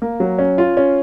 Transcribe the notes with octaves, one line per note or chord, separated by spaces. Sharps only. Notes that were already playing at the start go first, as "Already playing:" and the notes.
A#3
F#3
C#4
F4
C#4